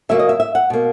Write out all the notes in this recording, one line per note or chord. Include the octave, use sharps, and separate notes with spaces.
C#3 F#3 A#3 E5
D#5
E5
E5
F#5
B2 A#3